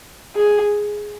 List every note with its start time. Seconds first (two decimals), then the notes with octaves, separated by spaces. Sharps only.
0.36 G#4